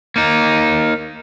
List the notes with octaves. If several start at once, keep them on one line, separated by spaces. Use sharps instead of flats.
A#3 D#4